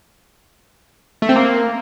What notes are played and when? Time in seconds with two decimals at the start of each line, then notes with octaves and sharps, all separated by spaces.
1.22 A3
1.29 C4
1.36 A#3